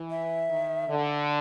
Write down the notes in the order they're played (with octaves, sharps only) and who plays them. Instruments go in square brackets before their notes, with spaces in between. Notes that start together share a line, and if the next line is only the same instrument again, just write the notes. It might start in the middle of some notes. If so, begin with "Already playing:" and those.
Already playing: [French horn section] E3
[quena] E5
[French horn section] D#3
D3